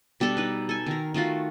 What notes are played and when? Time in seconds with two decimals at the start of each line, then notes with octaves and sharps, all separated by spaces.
0.20 B2 G3 D4 A4
0.37 D#4 B4
0.69 A4 G#5
0.86 D#3 A#4
1.14 D#3 A3 F4 F#4